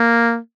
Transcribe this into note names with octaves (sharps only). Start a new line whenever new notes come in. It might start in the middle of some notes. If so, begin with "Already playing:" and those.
Already playing: A#3